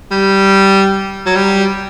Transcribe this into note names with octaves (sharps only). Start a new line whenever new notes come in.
G3
F#3
G3